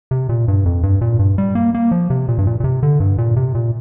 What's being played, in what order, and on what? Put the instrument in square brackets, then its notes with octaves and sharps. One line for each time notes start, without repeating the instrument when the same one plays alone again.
[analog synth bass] C3
A#2
G2
F2
G2
A#2
G2
G3
A#3
A#3
F3
C3
A#2
G2
A#2
A#2
C3
D3
G2
A#2
C3
A#2